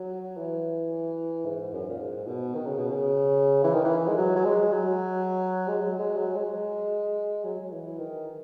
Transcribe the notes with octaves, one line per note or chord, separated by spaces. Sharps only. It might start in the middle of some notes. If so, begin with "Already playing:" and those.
Already playing: F#3
E3
G#2
F#2
A#2
G#2
B2
D#3
C#3
B2
C#3
E3
D#3
E3
G#3
F#3
F#3
G#3
F#3
G#3
F#3
G#3
F#3
G#3
F#3
F#3
E3
D#3